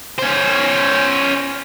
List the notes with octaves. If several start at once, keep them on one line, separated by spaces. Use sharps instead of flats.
C#4 C5